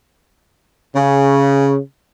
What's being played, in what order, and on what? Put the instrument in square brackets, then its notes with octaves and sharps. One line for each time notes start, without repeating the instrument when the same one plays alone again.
[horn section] C#3